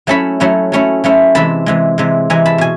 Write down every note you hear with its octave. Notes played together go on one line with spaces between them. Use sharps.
F#3 A3 C#4 E4 A5 B5
F#3 A3 C#4 E4
F#3 A3 C#4 E4
F#3 A3 C#4 E4
C3 E3 G#3 A5 B5
C3 E3 G#3
C3 E3 G#3
C3 E3 G#3 G#5 A#5
A5 B5
B2 G#5